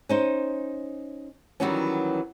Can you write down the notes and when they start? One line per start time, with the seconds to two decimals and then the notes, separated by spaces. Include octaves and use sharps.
0.09 C#4 D#4 C5
1.60 D#3 E3 F#3 G3 B3 C#4